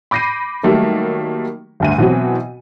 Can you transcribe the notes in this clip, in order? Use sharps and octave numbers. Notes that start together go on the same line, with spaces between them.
B5 D6 G6 A#6 C7 D#7
D#3 F#3 G3 A3 A#3
G1 D2 D#7
B2 E3 F#3 C4 F#4